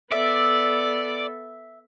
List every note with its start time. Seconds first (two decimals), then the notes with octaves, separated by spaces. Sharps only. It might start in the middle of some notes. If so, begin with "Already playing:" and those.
0.12 B3 A4 D5 E5